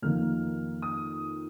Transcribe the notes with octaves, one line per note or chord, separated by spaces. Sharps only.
F2 D#3 A#3 F6
D#6